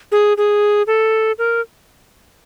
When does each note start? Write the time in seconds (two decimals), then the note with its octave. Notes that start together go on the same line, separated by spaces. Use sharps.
0.12 G#4
0.37 G#4
0.87 A4
1.38 A#4